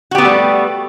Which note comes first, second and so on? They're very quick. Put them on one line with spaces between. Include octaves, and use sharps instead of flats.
F#4 G4 B3 A3 G3